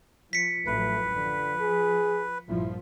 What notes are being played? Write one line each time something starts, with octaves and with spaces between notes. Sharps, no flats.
F3 B6 C#7
A1 F#2 F3 A3 B4
D3 F3
G#4
A#1 G2 F3 E4